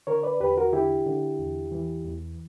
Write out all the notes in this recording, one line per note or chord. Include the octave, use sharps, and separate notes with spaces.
D3 A#4 C#5
B4 D5
E2 G4 B4
F#4 A#4
D3 E4 G4
D3
E2
E3
E2